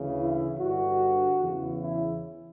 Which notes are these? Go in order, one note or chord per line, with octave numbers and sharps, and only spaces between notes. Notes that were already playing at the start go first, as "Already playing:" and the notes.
Already playing: D2 C#3 E3
E4
G2 D3 F#4
E2 C#3 E3
E4